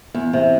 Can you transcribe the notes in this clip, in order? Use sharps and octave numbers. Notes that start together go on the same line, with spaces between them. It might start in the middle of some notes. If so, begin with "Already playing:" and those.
E2
C3